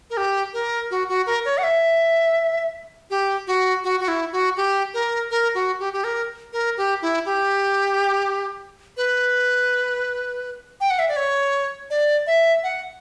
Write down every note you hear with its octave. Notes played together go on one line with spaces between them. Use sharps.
A#4
G4
A#4
F#4
F#4
A#4
C#5
F#5
E5
G4
F#4
F#4
F#4
E4
F#4
G4
A#4
A#4
F#4
G4
G4
A#4
A#4
G4
E4
G4
B4
G5
F#5
E5
D5
C#5
D5
E5
F#5